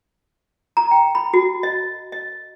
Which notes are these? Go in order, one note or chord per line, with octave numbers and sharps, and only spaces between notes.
A#5
G5
B5
F#4
D#5
D#5